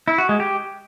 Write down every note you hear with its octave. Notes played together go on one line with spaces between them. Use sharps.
E4
F#4
G#3
G4